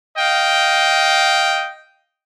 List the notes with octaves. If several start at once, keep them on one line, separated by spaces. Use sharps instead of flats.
D#5 F5 G5